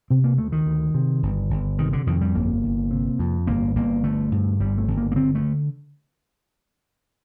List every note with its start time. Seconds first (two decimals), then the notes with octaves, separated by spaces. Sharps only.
0.10 C3 C4
0.24 A#3
0.38 D2 A3
0.52 D#3
0.66 D2
0.94 C3
1.23 G1
1.50 G1
1.79 C3 D#3
1.93 D3
2.07 F2 D#3
2.21 G3
2.34 G1 A#3
2.64 G1
2.91 C3
3.19 F2
3.47 G1 A#3
3.75 G1 A#3
4.04 D3 A3
4.32 G2
4.60 G1 G3
4.78 A3
4.87 G1
4.97 A#3
5.12 A#3
5.16 D3 C4
5.35 A3